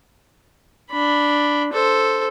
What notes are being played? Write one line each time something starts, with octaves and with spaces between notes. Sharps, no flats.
D4 B5
A4 C5